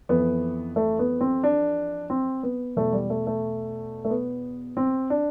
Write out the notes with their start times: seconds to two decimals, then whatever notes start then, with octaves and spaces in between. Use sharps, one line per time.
0.09 F2 E3 B3
0.76 A3
0.99 B3
1.21 C4
1.44 D4
2.10 C4
2.43 B3
2.76 E2 B2 A3
2.93 G3
3.10 A3
3.27 A3
4.05 A3
4.10 B3
4.77 C4
5.10 D4